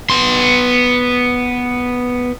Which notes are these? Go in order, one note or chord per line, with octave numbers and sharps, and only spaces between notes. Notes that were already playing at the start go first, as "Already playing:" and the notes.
B3 C6